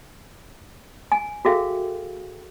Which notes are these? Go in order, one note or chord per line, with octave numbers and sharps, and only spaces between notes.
G#5
F#4 G#4 A4 E5 F5 G5